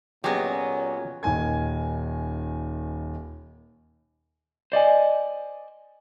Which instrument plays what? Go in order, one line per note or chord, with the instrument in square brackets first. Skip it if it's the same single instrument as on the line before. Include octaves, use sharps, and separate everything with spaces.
[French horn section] A#2 C#4 [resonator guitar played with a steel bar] F#3 B3 [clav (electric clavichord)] G4 G#4 D#5
[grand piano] D#1 D#3 G#5 G#6
[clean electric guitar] C5 D5 D#5 G#5